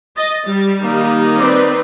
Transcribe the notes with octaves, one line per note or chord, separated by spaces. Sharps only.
D#5 A6
G3
D#3 A#3 D#4
C4 B4 D5